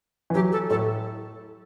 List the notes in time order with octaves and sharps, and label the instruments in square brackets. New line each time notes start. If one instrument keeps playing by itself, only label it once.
[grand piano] E3
[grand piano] F#3 [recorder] G4
[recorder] A4
[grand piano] A2 [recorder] A4